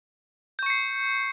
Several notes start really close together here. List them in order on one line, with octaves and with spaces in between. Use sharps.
G6 C#6 C#7 C7